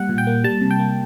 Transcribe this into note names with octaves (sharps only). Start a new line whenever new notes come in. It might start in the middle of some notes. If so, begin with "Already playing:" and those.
Already playing: G3 A#3 F#5
A#2
G5
A#3
G3 A5
C3
G5
A#3